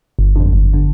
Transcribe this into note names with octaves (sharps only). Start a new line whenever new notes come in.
G1
F2 D3
G1
D3